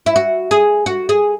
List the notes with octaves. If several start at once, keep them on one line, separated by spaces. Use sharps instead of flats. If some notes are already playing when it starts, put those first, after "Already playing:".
E4
F#4
G#4
F#4
G#4